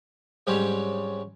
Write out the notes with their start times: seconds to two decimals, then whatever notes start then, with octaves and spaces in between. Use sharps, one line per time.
0.47 G#2 F#3 G3 C4 C#4 G4